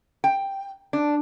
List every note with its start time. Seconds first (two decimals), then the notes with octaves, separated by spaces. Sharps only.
0.24 G5
0.93 D4